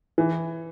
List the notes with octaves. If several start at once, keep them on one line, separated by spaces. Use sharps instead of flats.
E3